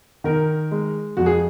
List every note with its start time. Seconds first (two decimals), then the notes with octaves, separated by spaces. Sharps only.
0.24 D#3 A#4
0.71 G#3
1.17 F2 F#4
1.26 G#4